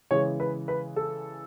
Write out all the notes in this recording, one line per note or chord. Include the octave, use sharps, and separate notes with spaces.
C#3 E3 G#3 C#5
B4
B4
A4